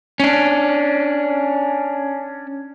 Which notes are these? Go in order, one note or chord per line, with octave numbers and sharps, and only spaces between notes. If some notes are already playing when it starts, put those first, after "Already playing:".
C#4 D4